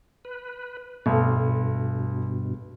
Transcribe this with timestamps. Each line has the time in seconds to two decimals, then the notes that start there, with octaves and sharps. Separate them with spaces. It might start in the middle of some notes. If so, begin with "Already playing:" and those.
0.25 B4
1.06 B1 G2 B2 A3